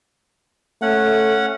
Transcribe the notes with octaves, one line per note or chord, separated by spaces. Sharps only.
A3 C#4 F#5